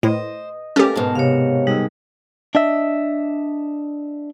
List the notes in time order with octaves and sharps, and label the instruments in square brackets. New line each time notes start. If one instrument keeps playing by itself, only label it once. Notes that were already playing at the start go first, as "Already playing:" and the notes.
[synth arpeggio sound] A2 [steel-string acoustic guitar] C5 [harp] D#5 D#6
[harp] A3 E6 F#6 [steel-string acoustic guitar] A#3 A#4 [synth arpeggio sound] C#4 G4 [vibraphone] A4
[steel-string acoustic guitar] G#2 B2 [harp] A#4 C5 F6 [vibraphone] A5
[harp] C3 [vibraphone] C#5 F5
[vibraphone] G3 D#4 [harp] G#3 A#3 E6
[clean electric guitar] D4 D#5 E5